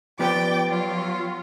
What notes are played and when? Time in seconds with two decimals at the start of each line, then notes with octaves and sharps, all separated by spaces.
0.19 F3 B3 G4 D5 G5 D6
0.67 F#3 F4